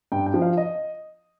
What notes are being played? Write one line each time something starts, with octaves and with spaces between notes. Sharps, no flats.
G2 G5
G5
F3
F5
D#5